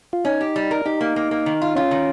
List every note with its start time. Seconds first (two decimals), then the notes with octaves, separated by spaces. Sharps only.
0.13 F4
0.25 C#4 D#4
0.41 G4
0.56 G3
0.71 A#4
0.86 D#4 G4
1.01 A#3
1.16 A#3
1.31 A#3
1.46 D#3
1.62 F4
1.75 C#4 F4
1.91 D#3